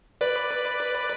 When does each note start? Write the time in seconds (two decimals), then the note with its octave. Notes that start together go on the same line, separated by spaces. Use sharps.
0.21 B4 D5